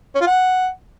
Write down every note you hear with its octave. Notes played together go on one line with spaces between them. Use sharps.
C#4
F4
F#5